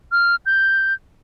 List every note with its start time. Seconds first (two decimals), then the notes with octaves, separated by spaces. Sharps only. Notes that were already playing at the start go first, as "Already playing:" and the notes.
0.12 F6
0.46 G6